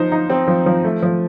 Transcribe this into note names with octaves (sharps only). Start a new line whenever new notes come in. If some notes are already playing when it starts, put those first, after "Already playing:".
Already playing: F3 D#4 C5
D#4
C4
F3
F3
A3
F3